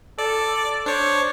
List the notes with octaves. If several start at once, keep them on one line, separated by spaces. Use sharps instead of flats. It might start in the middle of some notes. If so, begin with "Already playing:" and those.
A4 D5
D4 C5 C#5